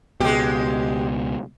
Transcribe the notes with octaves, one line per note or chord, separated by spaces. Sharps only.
C#2 B2 G#3 G4